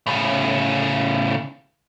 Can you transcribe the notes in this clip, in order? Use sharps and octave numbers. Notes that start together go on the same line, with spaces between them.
A2 C#3